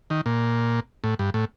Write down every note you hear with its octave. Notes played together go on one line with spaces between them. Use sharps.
D#3
A#2
A2
G2
A2